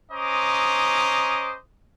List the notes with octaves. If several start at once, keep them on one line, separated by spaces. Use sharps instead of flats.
C#4 C5 D#5 A#5 D6 D#6